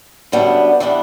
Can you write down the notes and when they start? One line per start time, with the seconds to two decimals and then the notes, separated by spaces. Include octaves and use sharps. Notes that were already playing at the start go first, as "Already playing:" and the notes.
0.32 F#2 D3 G3 B3 D4
0.80 E3 G3 B3 D4